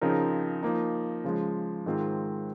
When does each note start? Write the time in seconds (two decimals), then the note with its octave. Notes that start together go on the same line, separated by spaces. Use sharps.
0.01 C#3 F3 C4 D#4 A#4
0.63 F3 A#3 D#4
1.24 C#3 F3 G#3
1.86 G#2 D#3 G#3 C4 F4